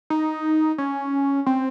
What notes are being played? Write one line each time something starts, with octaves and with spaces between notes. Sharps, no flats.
D#4
C#4
C4